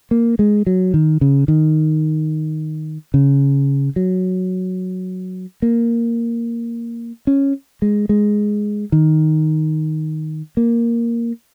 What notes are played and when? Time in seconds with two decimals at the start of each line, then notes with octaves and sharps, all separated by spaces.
0.11 A#3
0.39 G#3
0.67 F#3
0.94 D#3
1.21 C#3
1.48 D#3
3.14 C#3
3.96 F#3
5.62 A#3
7.27 C#4
7.82 G#3
8.09 G#3
8.92 D#3
10.57 A#3